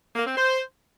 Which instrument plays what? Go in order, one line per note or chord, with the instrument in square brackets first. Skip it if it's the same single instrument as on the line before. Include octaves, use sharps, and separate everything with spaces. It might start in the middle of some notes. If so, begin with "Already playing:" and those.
[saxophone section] A#3
C4
C5